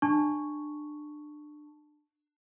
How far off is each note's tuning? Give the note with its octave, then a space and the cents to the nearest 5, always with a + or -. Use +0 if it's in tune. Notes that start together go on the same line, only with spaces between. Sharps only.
D4 +25 A5 +0 C#6 +0